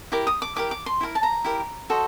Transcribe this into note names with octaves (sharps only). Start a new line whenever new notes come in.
E4 G4 A#4 D6
D#6
D6
E4 G4 A#4 D6
D6
C6
E4 G4 A#4
A5
A#5
E4 G4 A#4
F#4 A4 C5 D#5